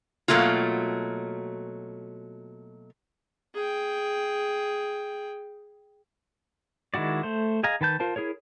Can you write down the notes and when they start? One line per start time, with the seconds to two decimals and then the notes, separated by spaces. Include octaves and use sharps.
0.28 B2 E3 F#3 A3 A#3 F4
3.55 G#4 G5
6.94 D#3 G#3 E4 F#4 D5
7.23 A3 C5
7.63 G#4 D#5 F5 G#5 A#5
7.81 D#3 B4 A5 G6
8.00 F4 A#4 C5 A5
8.16 E4 G#4 A#4 C#5